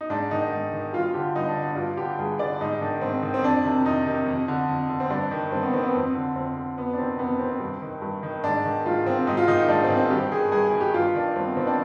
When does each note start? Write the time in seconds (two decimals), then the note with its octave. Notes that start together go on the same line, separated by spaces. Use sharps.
0.01 D#4
0.10 G#2 D4
0.31 D#3 D#4
0.51 G#2
0.73 D#3
0.93 G2 F4
1.04 F4
1.14 D3 G4
1.35 G2 D#4
1.49 D4
1.56 D3
1.63 D4
1.76 G2 F4
1.97 D3 G4
2.19 G2 G#4
2.39 D3 D5
2.61 G#2 D#4
2.81 D#3 D4
3.01 G#2 C4
3.23 D#3
3.34 C4
3.43 F2 D4
3.65 C3 D#3
3.85 F2 D#4
4.07 C3 D#3
4.26 F2
4.48 D3
4.68 F2
4.90 D3
5.00 C4
5.10 G2 D4
5.31 D#3
5.52 G2 C4
5.62 B3
5.73 D#3 C4
5.83 B3
5.94 F2 C4
6.15 D3
6.36 F2 C4
6.56 D3
6.77 F2 B3
6.93 D4
6.98 C3 D#3 C4
7.19 F2 B3
7.39 C3 D#3 C4
7.60 G2
7.82 D#3
8.02 G2
8.23 D#3
8.43 G#2 D4
8.65 D#3
8.85 G#2 F4
9.06 D#3 C4
9.27 G#2 D#4
9.37 F4
9.48 D#3 D#4
9.58 D#4
9.69 G#2 D4
9.84 C4
9.90 D#3
9.97 C4
10.10 G2 G4
10.32 D#3 G#4
10.52 G2 G#4
10.67 G#4
10.73 D#3
10.80 G4
10.94 G2 F4
11.14 D#3 D4
11.36 G2 C4
11.47 B3
11.57 D#3 C4
11.67 D4